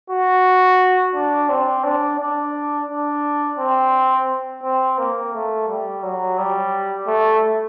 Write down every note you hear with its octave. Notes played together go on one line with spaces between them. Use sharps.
F#4
D4
C4
D4
D4
D4
C4
C4
A#3
A3
G3
F#3
G3
A3